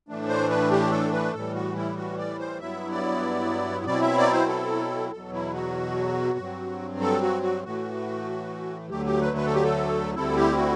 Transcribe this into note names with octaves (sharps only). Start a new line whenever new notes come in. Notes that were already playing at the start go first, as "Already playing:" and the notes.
A2 E3 A3 D4
C5
B4
G4
A4
B4
A2 E3 G3 A4
F#4
E4
F#4
D5
C5
G2 F#3 B3 E4 E5
D5
B2 F#3 C4 E4 D5
E5
D5
C5
A4
E2 B2 F#3 A4
E4
F#4
G2 F#3 C4
A4
F#4
F#4
A2 E3 A3 F#4
D2 D3 F#3 A3 G4
G4
B4
B4
A4
G4
A4
D2 D3 G3 C4 E4 A4
G4
F#4